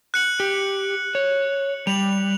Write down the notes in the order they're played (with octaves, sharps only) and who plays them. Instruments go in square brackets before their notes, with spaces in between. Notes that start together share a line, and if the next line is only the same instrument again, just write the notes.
[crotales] F#6 C#7 F#7
[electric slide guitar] G4
C#5
[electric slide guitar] G3 [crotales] F7 F#7